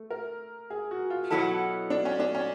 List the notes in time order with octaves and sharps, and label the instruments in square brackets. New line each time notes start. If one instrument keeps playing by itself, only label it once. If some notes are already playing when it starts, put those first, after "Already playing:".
Already playing: [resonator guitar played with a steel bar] A3
[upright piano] A#4
G#4
F#4
F4
[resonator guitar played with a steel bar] B2 F#3 B3 E4 A4
[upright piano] D4
C#4
D4
C#4